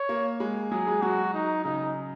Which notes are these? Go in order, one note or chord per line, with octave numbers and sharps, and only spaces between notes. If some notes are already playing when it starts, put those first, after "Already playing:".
Already playing: C#5
A#3
G#3
F#3 G#4
G#3
F#3 F#4
D#4
C#3 D#4